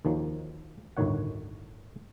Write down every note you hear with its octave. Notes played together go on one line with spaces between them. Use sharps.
D#2 D#3 F3 F#3
G1 D2 A2 D#3 C#5 F#5